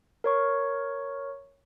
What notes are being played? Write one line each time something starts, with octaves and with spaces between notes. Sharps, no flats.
A#4 C#5 C#6